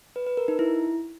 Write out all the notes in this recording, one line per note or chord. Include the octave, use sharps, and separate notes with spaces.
B4
B4
A#4
D#4
E4